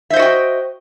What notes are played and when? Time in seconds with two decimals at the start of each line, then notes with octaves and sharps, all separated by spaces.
0.10 E5
0.13 C5
0.16 D#5
0.19 F#4
0.22 G5